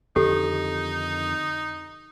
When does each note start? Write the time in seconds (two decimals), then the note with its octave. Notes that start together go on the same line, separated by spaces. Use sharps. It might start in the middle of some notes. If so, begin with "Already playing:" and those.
0.16 F2 D3 D#3 D#4 G4 A4